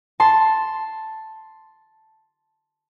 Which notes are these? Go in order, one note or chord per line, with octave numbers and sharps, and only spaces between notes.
A5 C6